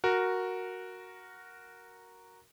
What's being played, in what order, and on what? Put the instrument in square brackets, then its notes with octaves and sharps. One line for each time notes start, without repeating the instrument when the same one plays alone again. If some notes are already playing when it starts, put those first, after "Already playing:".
[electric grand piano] F#4 A#4